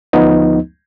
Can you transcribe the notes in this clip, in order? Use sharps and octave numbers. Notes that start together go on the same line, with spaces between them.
D2 F3 B3 D#4